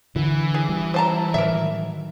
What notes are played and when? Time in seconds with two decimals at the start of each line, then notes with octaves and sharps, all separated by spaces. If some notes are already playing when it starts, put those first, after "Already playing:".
0.16 D3 E3
0.54 G#4
0.69 G3
0.94 C5 A5 A#5
1.34 A2 D#3 F#3 A#4 E5